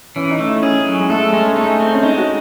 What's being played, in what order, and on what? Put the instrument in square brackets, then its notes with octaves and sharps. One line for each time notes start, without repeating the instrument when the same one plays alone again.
[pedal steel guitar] E3 [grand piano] C#4
[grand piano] D#4
[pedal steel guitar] A3
[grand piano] E4
[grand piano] C#4 [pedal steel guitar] G#4
[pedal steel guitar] F#3
[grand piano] G#3
[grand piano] A3 [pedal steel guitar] A4
[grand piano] G#3 [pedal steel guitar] C#4
[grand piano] A3 [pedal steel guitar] D#4
[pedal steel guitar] C4
[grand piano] C#4
[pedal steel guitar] G#3 [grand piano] D#4
[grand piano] F#4